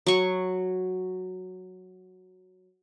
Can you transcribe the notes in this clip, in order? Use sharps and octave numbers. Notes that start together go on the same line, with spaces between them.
F#3 C#6